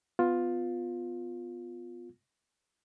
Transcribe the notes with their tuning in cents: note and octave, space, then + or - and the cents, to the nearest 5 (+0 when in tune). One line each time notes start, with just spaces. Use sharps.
B3 +20 F4 +10